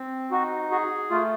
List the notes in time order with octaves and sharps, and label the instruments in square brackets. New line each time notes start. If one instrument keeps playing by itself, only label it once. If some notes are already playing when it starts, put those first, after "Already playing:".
Already playing: [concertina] C4
[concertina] D#4 [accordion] F#4
[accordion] F#4 [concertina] G#4
[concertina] A3 [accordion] F4